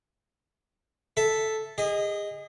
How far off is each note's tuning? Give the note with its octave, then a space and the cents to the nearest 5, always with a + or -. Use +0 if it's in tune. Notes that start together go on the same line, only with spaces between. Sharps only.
A4 -5 E5 +0
G#4 -35 D#5 +0